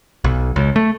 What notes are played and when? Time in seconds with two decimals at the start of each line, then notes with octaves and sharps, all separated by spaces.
0.24 B1
0.56 C#2
0.76 A3